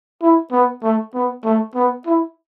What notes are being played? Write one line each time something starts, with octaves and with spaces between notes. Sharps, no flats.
E4
B3
A3
B3
A3
B3
E4